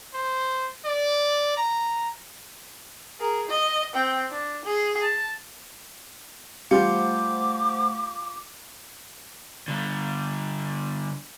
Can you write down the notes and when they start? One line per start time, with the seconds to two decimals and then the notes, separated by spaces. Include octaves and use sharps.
0.14 C5
0.85 D5
1.57 A#5
3.20 G#4 A#4
3.49 D#5
3.94 C4 G5
4.31 D4
4.65 G#4
5.01 A5
6.71 G3 A3 F4 C5 F#5 D6
9.68 D3 G3